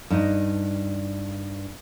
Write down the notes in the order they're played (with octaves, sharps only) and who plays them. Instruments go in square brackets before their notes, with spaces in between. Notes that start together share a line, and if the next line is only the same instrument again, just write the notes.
[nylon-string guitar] G2 D#4